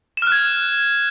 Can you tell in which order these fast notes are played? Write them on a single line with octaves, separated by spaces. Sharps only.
E7 F6 F#6 G#6